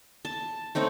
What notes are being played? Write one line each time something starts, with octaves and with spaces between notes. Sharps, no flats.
A5
A3 C4 D#4 C#5